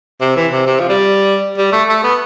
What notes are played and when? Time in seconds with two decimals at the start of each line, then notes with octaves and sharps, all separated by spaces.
0.21 C3
0.36 E3
0.52 C3
0.66 C3
0.80 F3
0.89 G3
1.58 G3
1.73 A3
1.89 A3
2.04 B3